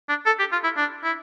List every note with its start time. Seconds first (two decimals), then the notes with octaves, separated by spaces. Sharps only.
0.09 D4
0.26 A4
0.39 G4
0.52 F4
0.64 E4
0.77 D4
1.03 E4